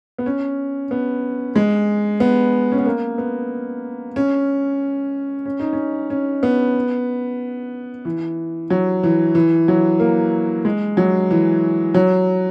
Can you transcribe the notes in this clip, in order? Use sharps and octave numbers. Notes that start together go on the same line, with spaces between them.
B3
C#4
B3
G#3
B3
C#4
B3
A#3
B3
C#4
C#4
D#4
C#4
C#4
B3
E3
F#3
E3
E3
F#3
A#3
G#3
F#3
E3
F#3